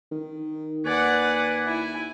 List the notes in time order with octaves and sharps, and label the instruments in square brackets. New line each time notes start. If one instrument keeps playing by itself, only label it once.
[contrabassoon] D#3
[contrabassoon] D#2 [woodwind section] B4 G#5 [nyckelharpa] D5 F#5
[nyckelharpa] E4 G#5